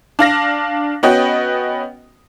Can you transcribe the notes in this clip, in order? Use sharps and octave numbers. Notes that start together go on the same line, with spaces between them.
D4 F5 A#6
B3 C#4 F#4 B4 D#5 G5